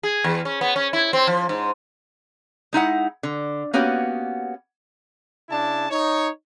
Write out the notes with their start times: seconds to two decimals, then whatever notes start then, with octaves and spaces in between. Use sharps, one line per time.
0.03 G#4
0.24 E2
0.45 C#4
0.61 B3
0.76 C#4
0.93 E4
1.13 C4
1.27 F3
1.49 G#2
2.73 G#3 D#4 E4 F#5
3.23 D3
3.73 A#3 B3 C#4 F#4 G4
5.50 C#3 D4 E4 A5
5.90 D#4 C#5